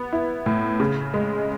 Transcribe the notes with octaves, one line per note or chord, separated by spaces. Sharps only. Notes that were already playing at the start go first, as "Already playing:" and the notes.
Already playing: B3
E4
A2
C#3
G#3